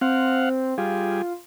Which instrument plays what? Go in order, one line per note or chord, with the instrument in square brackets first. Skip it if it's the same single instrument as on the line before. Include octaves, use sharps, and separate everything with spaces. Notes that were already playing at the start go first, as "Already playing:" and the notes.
[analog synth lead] C4 [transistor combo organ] F5 F#5
[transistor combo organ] G3 G#4 [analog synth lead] F4